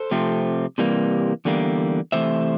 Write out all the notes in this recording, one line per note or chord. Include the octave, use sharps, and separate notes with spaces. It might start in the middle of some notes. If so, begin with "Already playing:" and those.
Already playing: A4 C5
C3 F3 A3 C4
C3 E3 G3 A#3
E2 D3 G3 A#3
C3 E3 A3 C5 E5